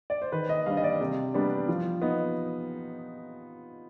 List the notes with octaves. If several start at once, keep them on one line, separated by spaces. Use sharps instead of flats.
D5
C5
D#3 B4
D#5
G3 D4 F5
D#5
D5
C3 G4
G3 B3 D4
F3
B3 D#4